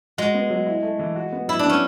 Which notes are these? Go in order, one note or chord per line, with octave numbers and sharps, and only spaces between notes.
G#3 F#4
B3
F#3
E4
A3
E3
F#4
B3
F#3 E4
D4
B3 C#4